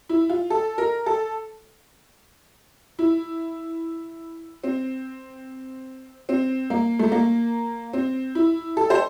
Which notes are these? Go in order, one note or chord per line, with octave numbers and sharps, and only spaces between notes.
E4
F4
A4
A#4
A4
E4
C4
C4
A#3
A3
A#3
C4
E4
A4
C5